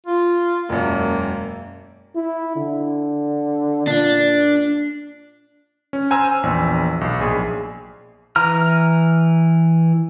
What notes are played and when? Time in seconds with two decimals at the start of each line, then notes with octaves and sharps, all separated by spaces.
0.06 F4
0.69 E1 F#2 A#3
2.15 E4
2.56 D3
3.87 A#2 D4
5.93 C#4
6.11 C5 G#5 A#5 E6 F6
6.43 A#1 E2
7.01 B1
7.20 A#1 G#4
8.36 E3 A#5 F6